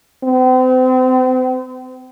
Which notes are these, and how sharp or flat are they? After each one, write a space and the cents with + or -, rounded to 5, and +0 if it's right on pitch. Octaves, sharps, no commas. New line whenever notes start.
C4 -35